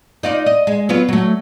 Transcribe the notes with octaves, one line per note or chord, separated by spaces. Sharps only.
D#4 F4 D5
D#5
G#3
F#3 B3 F4
F#3 A3